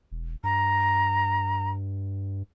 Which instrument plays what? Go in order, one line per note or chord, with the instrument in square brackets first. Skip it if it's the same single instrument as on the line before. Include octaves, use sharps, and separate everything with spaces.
[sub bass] E1
[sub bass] G2 [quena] A#5